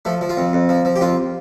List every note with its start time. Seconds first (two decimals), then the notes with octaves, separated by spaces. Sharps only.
0.05 F3 A3
0.21 F3
0.29 F4
0.37 F2
0.53 F2
0.69 F3
0.85 F3
0.96 G4
1.01 F2 F4